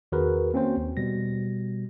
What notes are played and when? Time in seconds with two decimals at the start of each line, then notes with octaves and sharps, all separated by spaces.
0.12 E2 D#3 F#4 G#4 A#4 B4
0.53 A#3 C4 C#4 F#4 C5 G5
0.77 D#2
0.97 B2 G3 A#6